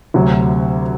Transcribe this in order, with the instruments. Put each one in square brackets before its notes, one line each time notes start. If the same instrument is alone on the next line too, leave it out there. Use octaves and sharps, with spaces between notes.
[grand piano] D2 C3 F#3